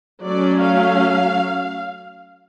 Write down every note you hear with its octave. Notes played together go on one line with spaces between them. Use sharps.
F#3 A3 C#4 D5
F5